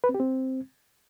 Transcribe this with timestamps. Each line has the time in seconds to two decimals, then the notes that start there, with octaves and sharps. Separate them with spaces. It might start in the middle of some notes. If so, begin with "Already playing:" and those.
0.04 B4
0.09 C4
0.14 G4
0.20 C4